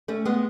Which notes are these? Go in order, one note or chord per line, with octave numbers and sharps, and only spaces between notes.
A3 C#4
G#3 B3